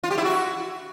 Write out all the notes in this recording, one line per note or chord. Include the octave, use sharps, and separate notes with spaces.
F4
G4
E4
F#4